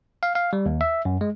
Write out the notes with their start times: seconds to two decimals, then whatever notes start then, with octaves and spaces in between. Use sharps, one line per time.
0.23 F5
0.35 F5
0.53 G3
0.66 D#2
0.81 E5
1.05 F#2
1.21 G#3